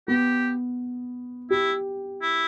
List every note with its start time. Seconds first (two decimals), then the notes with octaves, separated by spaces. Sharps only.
0.08 B3 G4
1.50 E4 G4
2.22 E4